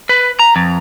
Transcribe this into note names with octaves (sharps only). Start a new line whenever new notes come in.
B4
A#5
F2